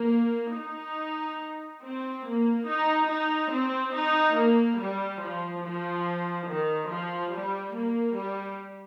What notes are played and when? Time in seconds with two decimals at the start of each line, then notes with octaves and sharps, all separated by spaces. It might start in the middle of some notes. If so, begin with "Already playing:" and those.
Already playing: A#3
0.56 D#4
1.83 C4
2.25 A#3
2.67 D#4
3.10 D#4
3.51 C4
3.94 D#4
4.36 A#3
4.78 G3
5.21 F3
5.63 F3
6.47 D#3
6.89 F3
7.32 G3
7.74 A#3
8.16 G3